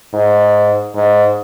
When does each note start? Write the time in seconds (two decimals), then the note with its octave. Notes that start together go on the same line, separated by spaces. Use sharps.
0.14 G#2
0.95 G#2